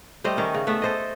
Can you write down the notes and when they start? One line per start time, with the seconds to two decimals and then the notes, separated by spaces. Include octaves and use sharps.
0.24 G3 A3 C5 D#5
0.37 D#3 C#4
0.54 C#3
0.67 A3 B3 E5
0.82 A4 C5 D#5